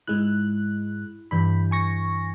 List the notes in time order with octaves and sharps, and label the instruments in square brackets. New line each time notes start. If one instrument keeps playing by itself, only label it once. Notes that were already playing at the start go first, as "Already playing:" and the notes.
[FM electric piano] G#2 G#3 F#6 [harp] E4
[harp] G2 E3 G6 [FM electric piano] B5
[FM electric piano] G#5 C#6 A#6